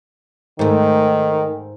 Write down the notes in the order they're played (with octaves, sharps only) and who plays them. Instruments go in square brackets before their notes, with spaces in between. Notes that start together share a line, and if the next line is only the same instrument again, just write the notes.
[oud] G#2 A3 [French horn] D#3